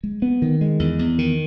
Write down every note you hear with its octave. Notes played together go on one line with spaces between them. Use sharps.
G#3
B3
D#3
G#3
E2
E2
D#3